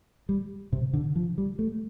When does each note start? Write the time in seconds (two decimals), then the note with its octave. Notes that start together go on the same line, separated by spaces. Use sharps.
0.29 G3
0.73 C3
0.93 D3
1.16 F3
1.38 G3
1.59 A3